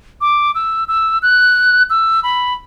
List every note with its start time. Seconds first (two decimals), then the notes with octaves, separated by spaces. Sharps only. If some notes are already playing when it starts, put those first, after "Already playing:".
0.21 D6
0.55 E6
0.88 E6
1.22 F#6
1.90 E6
2.23 B5